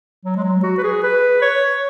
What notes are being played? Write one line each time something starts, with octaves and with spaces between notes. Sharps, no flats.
F#3
G#3
F#3
F#4
B4
G#4
B4
C#5